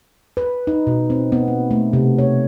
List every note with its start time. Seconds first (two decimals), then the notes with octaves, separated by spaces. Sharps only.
0.37 B4
0.67 D#4
0.87 B2
1.10 C4
1.32 B3
1.48 A#3
1.71 A3
1.93 C3
2.18 C#5